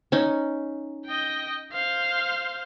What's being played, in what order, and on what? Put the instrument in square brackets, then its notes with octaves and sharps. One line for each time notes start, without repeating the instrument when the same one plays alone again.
[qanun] C#4 D#4
[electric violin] D#5 G5
C5 F5